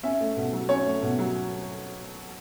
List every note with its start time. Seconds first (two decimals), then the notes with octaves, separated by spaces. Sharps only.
0.03 C#4 E5
0.20 A3
0.36 B2
0.53 F#3
0.69 C#4 C#5
0.85 A3
1.02 B2
1.19 F#3